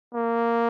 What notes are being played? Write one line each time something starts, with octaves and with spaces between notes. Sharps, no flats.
A#3